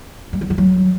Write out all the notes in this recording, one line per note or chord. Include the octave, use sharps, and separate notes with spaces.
G3
F#3
F3
F#3